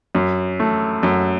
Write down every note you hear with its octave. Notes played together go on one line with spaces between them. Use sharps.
F#2
A3
F#2